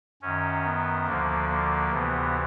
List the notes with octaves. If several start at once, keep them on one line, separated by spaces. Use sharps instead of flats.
F#2 D#3 C#4
B3
D2 D3 F3 A#3
A#3
D2 C3 E3 B3